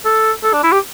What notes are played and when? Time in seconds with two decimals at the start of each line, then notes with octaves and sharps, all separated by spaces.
0.05 A4
0.43 A4
0.53 D4
0.63 E4
0.72 G4